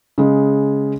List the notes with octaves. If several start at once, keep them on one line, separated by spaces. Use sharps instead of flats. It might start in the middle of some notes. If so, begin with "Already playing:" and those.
C#3 G#3